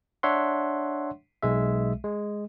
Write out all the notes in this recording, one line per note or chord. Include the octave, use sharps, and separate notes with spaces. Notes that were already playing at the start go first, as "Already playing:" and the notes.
D4 C#5 E5 F#5 C6
B1 G#3 E5
G#3